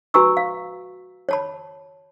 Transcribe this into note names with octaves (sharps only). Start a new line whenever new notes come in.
F#4 B4 G#5 A#5 C#6 E6
F5
C#5 A5 B5